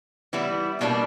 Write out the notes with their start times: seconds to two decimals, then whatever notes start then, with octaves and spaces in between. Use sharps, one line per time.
0.33 E3 G3 B3 E4
0.81 B2 G3 A#3 D4